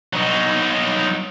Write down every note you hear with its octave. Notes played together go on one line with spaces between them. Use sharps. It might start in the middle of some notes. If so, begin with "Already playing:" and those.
F#3 D#4